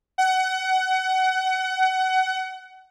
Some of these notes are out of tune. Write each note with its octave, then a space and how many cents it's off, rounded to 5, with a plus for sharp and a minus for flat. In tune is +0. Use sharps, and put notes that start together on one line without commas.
F#5 +25